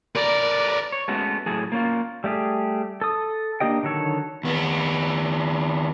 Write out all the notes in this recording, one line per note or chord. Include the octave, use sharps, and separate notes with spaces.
A#4 B4 D5
C#5
G#3 A3 B3 C#4 F#4
A2 F#3 G#4 A4
A#3 C#4 F4
G3 A3 G4 G#4
A4 D#6
A#3 D4 G4 D#5 G5
D3 D#3 F#3 A4 C#5
D#2 B3